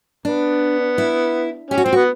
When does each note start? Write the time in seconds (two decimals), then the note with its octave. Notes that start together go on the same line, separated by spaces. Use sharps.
0.25 B3 D4
0.98 E4
1.71 C#4 G4
1.78 F#4
1.84 C4 F4
1.92 B3 F#4